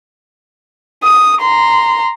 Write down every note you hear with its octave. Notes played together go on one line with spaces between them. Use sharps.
D#6
A#5 C6